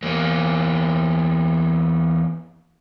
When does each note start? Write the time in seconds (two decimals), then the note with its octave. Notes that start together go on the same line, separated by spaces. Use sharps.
0.03 E2 A#3